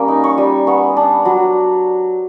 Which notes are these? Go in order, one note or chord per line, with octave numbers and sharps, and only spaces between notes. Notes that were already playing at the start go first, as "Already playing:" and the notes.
Already playing: G3 A#3 C#4
D#4
C#6
G3
B3 C#6
D4
F#3